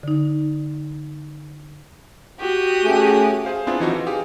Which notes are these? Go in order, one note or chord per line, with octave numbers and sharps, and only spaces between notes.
D3 D#4
F#4 G4 D#6
A3 C#4 G#4
G#4 C5 F5
B3 C4 D4 E4 F4 G#4
E3 F3 D#4 F4 F#4
E3
G4 G#4 F5